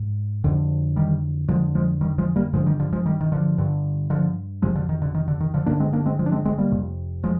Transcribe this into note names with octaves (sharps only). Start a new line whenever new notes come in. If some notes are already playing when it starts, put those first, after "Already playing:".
Already playing: G#2
F2 D3
D#3 G3
F2 D3 F3 G#3
F3 G#3
D#3 G3
F3 G#3
G3 A#3
G2 D3 F3 G#3
D#3 G3
D3 F3
F3 G#3
D#3 G3
D#3
D3 F3
G2 D3
D3 F3
F2 C3 F3 G#3
D3 F3
D#3
D3
D#3
D3
D#3
D3 F3
G2 D3 A#3 D4
G#3 C4
A#3 D4
G#3 C4
F3 G#3
D4
G#3 C4
G#3 C4
G3 A#3
F2 C3
F3 G#3